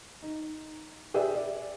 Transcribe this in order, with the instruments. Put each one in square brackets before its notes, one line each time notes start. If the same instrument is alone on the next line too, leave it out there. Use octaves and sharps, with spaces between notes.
[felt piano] D#4
G4 G#4 B4 D5 E5
D5